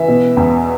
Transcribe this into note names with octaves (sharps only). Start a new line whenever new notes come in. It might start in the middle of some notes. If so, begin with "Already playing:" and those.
Already playing: E3 E5
B2
E2